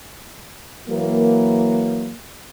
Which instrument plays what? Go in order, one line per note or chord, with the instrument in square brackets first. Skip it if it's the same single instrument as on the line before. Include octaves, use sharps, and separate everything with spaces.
[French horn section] E3 F#3 A#3